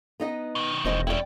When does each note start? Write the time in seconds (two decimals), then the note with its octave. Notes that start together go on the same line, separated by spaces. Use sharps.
0.20 B3 D#4 D#5
0.55 B2 D#3
0.85 E1 C4 C5 D#5
1.07 C#4 E4 D5 G5